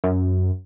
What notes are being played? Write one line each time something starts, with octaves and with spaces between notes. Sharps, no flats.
F#2